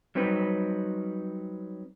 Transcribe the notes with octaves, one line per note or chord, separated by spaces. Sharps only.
F#3 G3 C4 D#4 B4